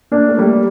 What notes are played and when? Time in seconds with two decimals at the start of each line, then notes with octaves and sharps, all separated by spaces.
0.12 A#3 D4
0.29 A3
0.38 G3 A#3